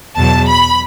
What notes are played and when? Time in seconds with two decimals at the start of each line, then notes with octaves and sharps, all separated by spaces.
0.17 E2 B2 F#3 A5
0.48 B5